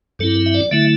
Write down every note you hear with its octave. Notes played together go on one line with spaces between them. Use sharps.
G2 F#3 C4 E4 A4
E5
D5
D3 F#3 A3 E4 E5